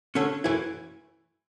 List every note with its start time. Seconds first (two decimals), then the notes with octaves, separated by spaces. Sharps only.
0.15 D3 A3 C#4
0.44 F#2 E3 A3 E4